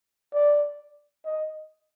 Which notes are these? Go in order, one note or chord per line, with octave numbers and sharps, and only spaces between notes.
D5
D#5